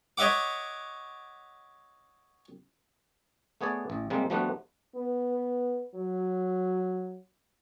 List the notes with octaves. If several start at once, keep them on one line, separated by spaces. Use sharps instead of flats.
C#5 D#5 E5 F#5 D6
A3 B3 G#4 C#5 D5
A1
C3 G3 G#3 A#3 C4
F3 G3 A3 B3 D4 F#4
B3
F#3